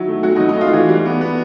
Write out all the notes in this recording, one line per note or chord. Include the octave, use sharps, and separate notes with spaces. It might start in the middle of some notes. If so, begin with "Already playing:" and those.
Already playing: D#3 F#3 E4
A3
F#3 F#4
D#4
F#3
D#4
A3 F4
F4
E3 F#4
G3
B3
B3